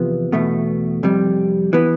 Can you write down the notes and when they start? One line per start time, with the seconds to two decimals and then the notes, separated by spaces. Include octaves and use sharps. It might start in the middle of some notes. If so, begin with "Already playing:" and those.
Already playing: E2 C3 F3 B3
0.32 E2 B2 A3
1.03 F2 C3 G3
1.73 E3 B3